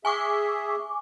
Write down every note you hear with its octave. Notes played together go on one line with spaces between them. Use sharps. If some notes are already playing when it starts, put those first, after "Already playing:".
G#4 E5 G#5 C#6 D6